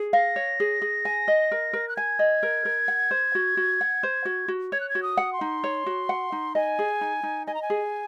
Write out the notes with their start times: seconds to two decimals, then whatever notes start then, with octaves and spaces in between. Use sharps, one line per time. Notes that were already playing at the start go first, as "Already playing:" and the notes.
Already playing: G#4
0.13 F5 A#6
0.36 C#5
0.60 G#4
0.82 G#4
1.05 G#5
1.28 D#5
1.51 A#4
1.73 A#4
1.88 F#6
1.96 G#5 G#6
2.19 D#5
2.43 A#4
2.65 A#4
2.88 F#5
3.11 C5
3.35 F#4
3.57 F#4
3.81 F#5
4.03 C5
4.25 F#4
4.48 F#4
4.72 C#5 G#6
4.80 F#6
4.89 G#6
4.95 F#4
5.03 D#6
5.17 F#5
5.33 C6
5.41 D#4
5.64 C#5
5.86 F#4
6.09 F#5
6.32 D#4
6.55 D#5 G#5
6.79 G#4
7.01 D#4
7.23 D#4
7.47 D#5 G#5
7.54 A#5
7.62 G#5
7.70 G#4